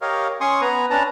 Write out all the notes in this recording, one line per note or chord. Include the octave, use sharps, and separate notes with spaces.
G4 A#4 C#5 D#5 F5
C#4 G#5 C6 C#6 D#6
B3 B4 G#5 A#5
C#4 D4 B4 A5 A#5